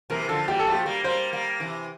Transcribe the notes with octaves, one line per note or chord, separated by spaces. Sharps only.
C3 E3 A#4
D3 F3 A4
E3 G3 G4
A4
F3 A3 G4
G3 A#3
G3 A#3 C5
G3 A#3
C3 E3